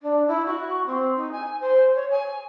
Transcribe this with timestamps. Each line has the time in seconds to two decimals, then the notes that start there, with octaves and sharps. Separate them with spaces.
0.02 D4
0.27 E4
0.46 F#4
0.86 C4
1.16 D#4
1.32 G#5
1.61 C5
1.95 C#5
2.11 G#5